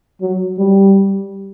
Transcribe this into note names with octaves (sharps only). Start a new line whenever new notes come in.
F#3
G3